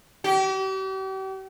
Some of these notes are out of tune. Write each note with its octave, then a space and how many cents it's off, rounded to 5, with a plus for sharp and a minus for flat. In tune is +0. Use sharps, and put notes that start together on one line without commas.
G4 -40